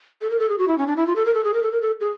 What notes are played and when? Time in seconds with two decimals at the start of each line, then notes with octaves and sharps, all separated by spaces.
0.21 A4
0.30 A#4
0.39 A4
0.49 G#4
0.58 F#4
0.68 E4
0.78 C#4
0.87 D4
0.96 E4
1.07 F4
1.16 A4
1.25 A#4
1.34 A4
1.44 G#4
1.54 A#4
1.63 A4
1.72 A#4
1.82 A4
2.00 G#4